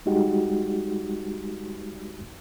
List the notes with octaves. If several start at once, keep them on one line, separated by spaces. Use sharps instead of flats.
G3 G#3 D#4 F#4 G4